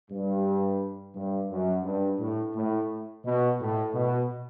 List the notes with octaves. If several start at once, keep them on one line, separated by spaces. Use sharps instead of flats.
G2
G2
F#2
G2
A2
A2
B2
A2
B2